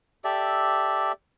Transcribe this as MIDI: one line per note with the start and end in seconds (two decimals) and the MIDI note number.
0.24 1.12 67
0.24 1.12 69
0.24 1.12 74
0.24 1.12 76